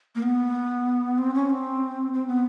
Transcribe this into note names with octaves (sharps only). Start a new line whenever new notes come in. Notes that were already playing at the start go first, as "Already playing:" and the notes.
A#3
B3
C4
C#4
C4
C4
B3